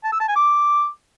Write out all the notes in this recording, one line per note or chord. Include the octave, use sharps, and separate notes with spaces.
A5
E6
A5
G#5
D6